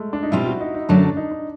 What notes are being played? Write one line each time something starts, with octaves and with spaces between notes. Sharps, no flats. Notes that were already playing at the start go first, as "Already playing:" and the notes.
Already playing: G#3 A3
D4
D#4
B2 G3 C4 E4 F4
F#4
D#4
D#4
F#2 D3 F#3 A3 D4
D#4
D4